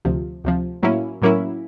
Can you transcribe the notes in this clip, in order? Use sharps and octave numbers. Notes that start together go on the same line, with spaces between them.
D2 C3 F3
D2 C3 F3
A2 F#3 A#3 C#4 E4
A2 F#3 A#3 C#4 E4